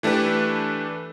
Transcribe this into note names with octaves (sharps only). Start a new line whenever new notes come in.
E3 A3 D4 G4 B4